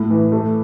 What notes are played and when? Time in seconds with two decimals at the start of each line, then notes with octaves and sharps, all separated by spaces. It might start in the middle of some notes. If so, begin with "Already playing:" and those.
Already playing: A2
0.10 E3
0.32 A3